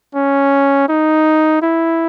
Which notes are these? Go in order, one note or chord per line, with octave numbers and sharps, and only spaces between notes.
C#4
D#4
E4